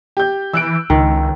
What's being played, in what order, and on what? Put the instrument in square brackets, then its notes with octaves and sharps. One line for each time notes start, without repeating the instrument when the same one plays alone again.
[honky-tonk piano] G4 G6
[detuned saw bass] E3 [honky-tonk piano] E6 F#6 D7
[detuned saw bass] C#2 [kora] D#3